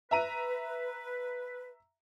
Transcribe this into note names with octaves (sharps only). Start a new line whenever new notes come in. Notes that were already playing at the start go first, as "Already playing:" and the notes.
B4 E5 A#5 D#7